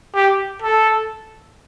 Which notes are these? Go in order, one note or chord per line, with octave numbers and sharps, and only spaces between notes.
G4
A4